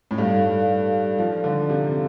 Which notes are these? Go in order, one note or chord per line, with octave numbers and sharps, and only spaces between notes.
A2
G2 D#4 A4 D5 F5
F3
D3
C3